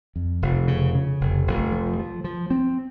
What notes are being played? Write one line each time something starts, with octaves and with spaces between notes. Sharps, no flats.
F2
F1
C#3
C#3
F1
F1
F3
F3
F3
C4